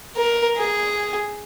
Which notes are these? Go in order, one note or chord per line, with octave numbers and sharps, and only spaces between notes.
A#4
G#4